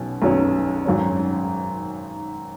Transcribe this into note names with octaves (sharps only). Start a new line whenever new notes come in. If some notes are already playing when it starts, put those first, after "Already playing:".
Already playing: B1 B2 C#4
B1 B2 F#3 C#4
G#1 F#2 F#3 C#4